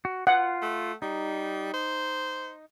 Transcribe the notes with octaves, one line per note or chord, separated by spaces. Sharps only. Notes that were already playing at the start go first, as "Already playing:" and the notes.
F#4
F4 F#5
A3
G3 D#4
C5